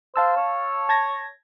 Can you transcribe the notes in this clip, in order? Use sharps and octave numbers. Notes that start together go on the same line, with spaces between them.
C5 F5 A5 E6
C#5
A5 G#6 A#6